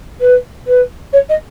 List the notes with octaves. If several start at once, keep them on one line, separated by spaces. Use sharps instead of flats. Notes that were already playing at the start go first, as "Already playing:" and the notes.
B4
B4
C#5
D#5